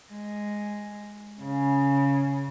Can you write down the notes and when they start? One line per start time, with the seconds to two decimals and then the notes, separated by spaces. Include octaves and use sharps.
0.12 G#3
1.42 C#3